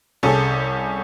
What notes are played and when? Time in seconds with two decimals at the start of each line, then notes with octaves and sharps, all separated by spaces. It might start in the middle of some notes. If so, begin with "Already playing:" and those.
0.23 C2 C#4 G#4 A4